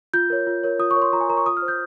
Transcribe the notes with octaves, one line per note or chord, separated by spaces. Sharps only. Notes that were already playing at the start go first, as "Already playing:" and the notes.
F4 G6
A#4 C#5
F4
A#4 C#5
F4 D#6
C#6
A#4 C#5
C6
F4 A#5
G#5
A#4 C#5 A#5 C#6
F4 D#6
F6
C5
G6